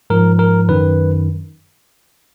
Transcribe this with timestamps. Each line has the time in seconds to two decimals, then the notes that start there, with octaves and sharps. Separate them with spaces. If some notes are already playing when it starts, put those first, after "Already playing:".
0.10 G#2 F3 A#4
0.39 A#4
0.69 F#2 D#3 B4